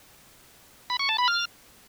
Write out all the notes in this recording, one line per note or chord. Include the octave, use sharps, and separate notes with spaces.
B5
C#6
A5
B5
F6